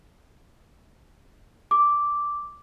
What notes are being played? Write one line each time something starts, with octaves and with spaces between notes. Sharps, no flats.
D6